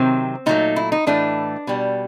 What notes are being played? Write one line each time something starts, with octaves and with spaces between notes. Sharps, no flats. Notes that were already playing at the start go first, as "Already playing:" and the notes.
Already playing: C3 D#3 F#3 C4
A#2 F#3 A3 D#4
E4
D#4
A2 E3 A3 D4
B2 G3